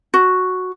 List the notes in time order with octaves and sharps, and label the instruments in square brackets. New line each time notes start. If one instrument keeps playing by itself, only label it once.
[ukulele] F#4